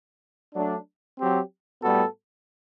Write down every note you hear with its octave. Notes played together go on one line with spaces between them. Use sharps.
F#3 A3 D4
F#3 C4 G4
A2 G3 B3 F#4 A4